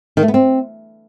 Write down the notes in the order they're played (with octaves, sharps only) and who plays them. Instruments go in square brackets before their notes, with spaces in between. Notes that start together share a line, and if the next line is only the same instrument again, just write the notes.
[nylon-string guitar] D#3
A3
B3
C4